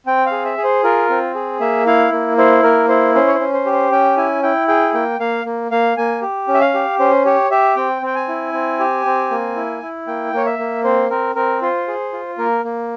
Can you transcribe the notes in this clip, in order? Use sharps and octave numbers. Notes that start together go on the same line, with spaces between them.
C4 G5
F5
G#4
E5
G#4
C5
F4 A#4
C4
G#4
A#3 E5
E4 F5
A#3
E4 C5
A#3 A#4
E4 C5
C#4 C5
C#5
C5
C#4
C5
G4
C5
C#4 G5
E4 G#5
E4 G5
G#4 G5
A#3 G5
A#3 F5
A#3
A#3 F5
A#3 G#5
G4
C#4
E5
F5
G4
C#4 C5
G4 C#5
G4 E5
C4 G5
C4 G5
G#5
E4
C4
G4
C4
A#3
E4
E4
A#3 G5
A#3 C#5
E5
A#3
C4 C5
C4 A#4
C4 A#4
F4 C5
G#4
F4
A#3 A#4
A#3